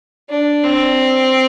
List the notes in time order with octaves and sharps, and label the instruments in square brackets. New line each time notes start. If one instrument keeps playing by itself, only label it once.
[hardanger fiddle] D4
C4